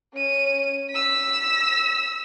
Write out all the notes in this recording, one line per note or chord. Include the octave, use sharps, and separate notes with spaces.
C#4 D#7
E6 B6